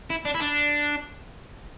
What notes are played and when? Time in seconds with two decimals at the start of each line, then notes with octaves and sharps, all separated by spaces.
0.10 E4
0.25 D4
0.34 E4
0.40 D4